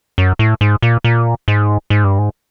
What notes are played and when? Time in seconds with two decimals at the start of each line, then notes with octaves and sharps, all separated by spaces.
0.18 F#2
0.39 A2
0.61 G#2
0.82 A#2
1.04 A#2
1.48 G#2
1.90 G#2
2.04 G2
2.18 G#2